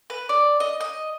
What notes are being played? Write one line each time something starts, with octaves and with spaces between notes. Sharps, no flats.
B4
D5
D#5
D#5